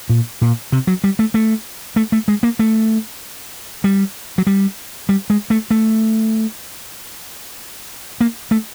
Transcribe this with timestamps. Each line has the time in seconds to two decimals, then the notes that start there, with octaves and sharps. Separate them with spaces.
0.09 A#2
0.41 A#2
0.72 C3
0.87 F#3
1.04 G3
1.19 A3
1.34 A3
1.96 A3
2.12 A3
2.28 G#3
2.43 A#3
2.59 A3
3.84 G3
4.38 F#3
4.47 G3
5.09 G3
5.30 G#3
5.50 A3
5.71 A3
8.21 A#3
8.51 A3